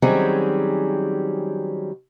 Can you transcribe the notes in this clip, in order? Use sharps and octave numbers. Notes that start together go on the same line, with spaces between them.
D#3 F#3 G3 C4 C#4 G#4